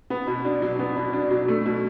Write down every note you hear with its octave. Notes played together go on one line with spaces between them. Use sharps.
B3
B2
D4
F#3
B3
B2
D4
F#3
A3
B2